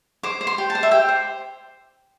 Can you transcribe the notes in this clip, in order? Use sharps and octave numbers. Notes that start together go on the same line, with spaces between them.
C5 D6
C5
C6
G4
A5
C5
E5
G4 G5
C5